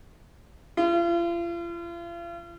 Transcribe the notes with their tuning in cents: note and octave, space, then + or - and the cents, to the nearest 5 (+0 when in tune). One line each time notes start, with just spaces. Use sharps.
F4 -40